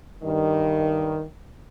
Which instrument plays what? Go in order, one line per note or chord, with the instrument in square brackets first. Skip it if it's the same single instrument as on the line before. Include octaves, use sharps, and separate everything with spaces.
[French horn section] G2 D#3